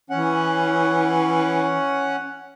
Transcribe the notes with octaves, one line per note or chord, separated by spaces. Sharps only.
E3 C#4 F#5